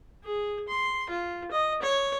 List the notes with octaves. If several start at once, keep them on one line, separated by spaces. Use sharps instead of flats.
G#4
C6
F4
D#5
C#5